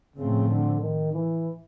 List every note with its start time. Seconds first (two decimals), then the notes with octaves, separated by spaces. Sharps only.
0.16 A2 C#3 F3 A3 C4
0.49 D3
0.81 D#3
1.13 E3